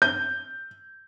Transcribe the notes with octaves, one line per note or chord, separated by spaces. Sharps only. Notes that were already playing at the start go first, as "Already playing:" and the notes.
G6